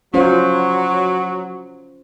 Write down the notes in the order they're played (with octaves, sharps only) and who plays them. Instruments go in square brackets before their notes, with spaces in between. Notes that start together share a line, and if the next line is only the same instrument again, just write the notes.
[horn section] F#3 [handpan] C#4 F4 C5